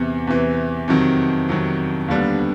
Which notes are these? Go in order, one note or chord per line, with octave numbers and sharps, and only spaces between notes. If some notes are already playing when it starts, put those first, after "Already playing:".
Already playing: E2 C3 E3
E2 C3 E3
F2 C3 D#3 F#3
F2 C3 D#3 F#3
D#2 D3 G3 B3 D4